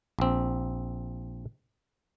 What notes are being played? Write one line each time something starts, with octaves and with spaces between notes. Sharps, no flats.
A#1 C4